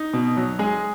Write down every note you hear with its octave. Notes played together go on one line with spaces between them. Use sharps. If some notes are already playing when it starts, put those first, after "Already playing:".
Already playing: D#4
B2
F#3
G#3 G#4